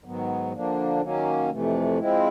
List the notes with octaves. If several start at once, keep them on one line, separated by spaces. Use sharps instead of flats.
G#2 D#3 F#3 B3
D3 F3 A#3 D4
D#3 F#3 A#3 C#4
F2 C3 E3 A3
F3 G#3 C4 E4